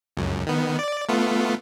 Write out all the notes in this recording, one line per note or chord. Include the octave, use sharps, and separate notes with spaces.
C#2 F#2
D#3 B3
D5
A3 B3 F4